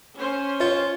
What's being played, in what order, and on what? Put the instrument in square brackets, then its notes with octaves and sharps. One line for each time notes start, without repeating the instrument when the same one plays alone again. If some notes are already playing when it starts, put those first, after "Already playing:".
[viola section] C#4 C5
[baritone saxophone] F4 [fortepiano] C#5